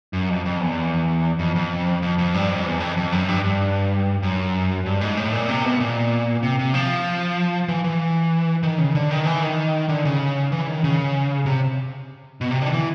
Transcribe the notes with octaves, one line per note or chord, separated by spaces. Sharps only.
F#2
F2
F2
E2
F2
F2
F2
F2
G2
F2
E2
F2
F2
F#2
G2
G2
F#2
G2
G#2
A2
A#2
C3
B2
A#2
C3
C3
F3
E3
E3
D#3
C#3
D3
D#3
E3
D#3
D3
C#3
E3
D#3
C#3
C3
B2
C3
D3
D#3
E3